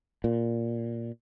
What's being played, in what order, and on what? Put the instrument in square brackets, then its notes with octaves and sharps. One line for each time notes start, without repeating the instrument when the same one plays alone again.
[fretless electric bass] A#2